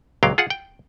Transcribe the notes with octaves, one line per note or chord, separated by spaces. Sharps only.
C#2 A#2 F#3 F5 G5
F4 G#4 F#5
G5